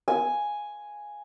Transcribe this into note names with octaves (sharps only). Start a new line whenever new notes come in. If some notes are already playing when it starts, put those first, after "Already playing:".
G#5